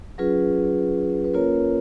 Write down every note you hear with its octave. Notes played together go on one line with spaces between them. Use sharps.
F#3 C#4 F4 G#4 B4
B4
A#3 C#4 F4 A#4 C#5